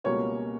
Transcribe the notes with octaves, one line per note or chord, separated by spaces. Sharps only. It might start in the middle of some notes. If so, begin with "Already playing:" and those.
C#2 B2 G3 A#3 C#4 C#5